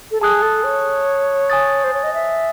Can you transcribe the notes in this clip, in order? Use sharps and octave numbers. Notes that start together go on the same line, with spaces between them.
A4
G#4 A5 D#6 F#6
A4
C#5
G#5 D#6 A6
C5
C#5
D#5
E5